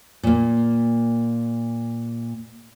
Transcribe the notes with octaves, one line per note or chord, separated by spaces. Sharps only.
A#2 A#3